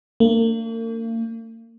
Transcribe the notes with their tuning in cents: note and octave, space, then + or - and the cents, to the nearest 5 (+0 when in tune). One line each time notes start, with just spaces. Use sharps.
A#3 -40 D4 +0